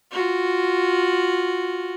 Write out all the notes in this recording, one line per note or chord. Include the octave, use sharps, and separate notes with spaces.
F4 F#4